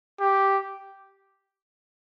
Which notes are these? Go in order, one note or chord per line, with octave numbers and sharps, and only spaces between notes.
G4